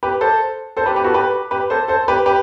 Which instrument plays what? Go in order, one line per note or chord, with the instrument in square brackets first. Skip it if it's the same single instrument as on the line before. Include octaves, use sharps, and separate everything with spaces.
[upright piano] G4 B4
A4 C5
A4 C5
G4 B4
G4 B4
F#4 A4
G4 B4
G4 B4
A4 C5
A4 C5
G4 B4
G4 B4